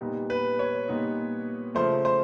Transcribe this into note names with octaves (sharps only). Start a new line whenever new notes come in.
A#2 G3 B3 D#4
B4
C#5
A#2 G3 B3 D#4
C#3 F3 A3 C5
C5